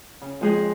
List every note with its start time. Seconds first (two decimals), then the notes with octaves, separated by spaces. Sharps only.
0.21 C#3
0.41 F2 G#3 G#4